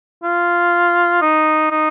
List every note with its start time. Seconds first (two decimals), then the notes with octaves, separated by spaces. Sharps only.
0.24 F4
1.22 D#4
1.71 D#4